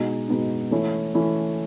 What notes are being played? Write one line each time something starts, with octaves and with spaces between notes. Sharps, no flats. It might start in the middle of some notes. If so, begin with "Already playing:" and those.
Already playing: B2 G#3 B3 D#4
B2 G#3 B3 D#4
E3 A3 C#4 E4
E3 A3 C#4 E4